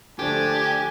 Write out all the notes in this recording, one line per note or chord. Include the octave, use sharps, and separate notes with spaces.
D3 F3 A3 D4 G4 G#5